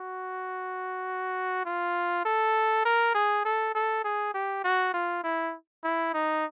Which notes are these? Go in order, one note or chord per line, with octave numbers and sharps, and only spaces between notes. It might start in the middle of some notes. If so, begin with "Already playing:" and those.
Already playing: F#4
F4
A4
A#4
G#4
A4
A4
G#4
G4
F#4
F4
E4
E4
D#4